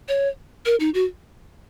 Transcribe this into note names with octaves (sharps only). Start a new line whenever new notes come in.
C#5
A#4
D#4
F#4